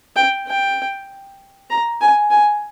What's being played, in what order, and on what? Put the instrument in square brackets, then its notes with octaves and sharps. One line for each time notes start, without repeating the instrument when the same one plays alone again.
[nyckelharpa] G5
G5
A#5
G#5
G#5